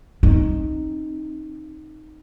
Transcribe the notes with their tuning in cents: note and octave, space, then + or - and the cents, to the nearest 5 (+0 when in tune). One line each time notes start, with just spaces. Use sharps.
C4 +40 D#4 +0